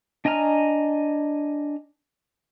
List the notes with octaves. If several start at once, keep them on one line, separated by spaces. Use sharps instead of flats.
D4 D#5 G#5 A#5 F6